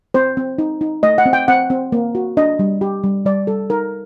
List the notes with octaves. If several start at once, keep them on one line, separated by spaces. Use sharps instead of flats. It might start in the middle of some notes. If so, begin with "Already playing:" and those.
C4 C5
C4
D#4
D#4
A3 D#5
F#5
C4
G5
C4 F#5
C4
A#3
F#4
D4 D#5
G3
G4
G3
G3 D5
G3 A4
D#4 A#4